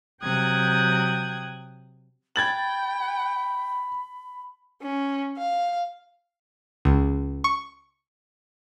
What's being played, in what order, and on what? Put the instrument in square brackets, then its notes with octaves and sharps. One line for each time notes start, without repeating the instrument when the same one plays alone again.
[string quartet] C3 F#3 G5 D#6 F#6 G#6
[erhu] G5 [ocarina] B5 [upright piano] G#6 A6 F#7
[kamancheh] C#4
F5
[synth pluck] C#2
C#6